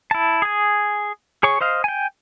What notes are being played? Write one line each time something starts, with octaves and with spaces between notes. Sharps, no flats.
E4 A5
G#4 G#5
G#4 C#5 C#6
C5 D#5 F5
G5 G#5